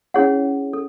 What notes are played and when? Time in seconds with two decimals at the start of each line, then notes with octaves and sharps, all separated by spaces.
0.14 C#4 E4 G#4 C#5 F#5
0.73 A4